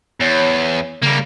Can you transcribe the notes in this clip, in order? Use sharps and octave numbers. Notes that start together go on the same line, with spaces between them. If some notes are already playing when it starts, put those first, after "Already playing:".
E2 C#5
C#3 G3 A#3